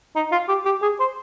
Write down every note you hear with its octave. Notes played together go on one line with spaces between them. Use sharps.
D#4
F4
G4
G4
G#4
C5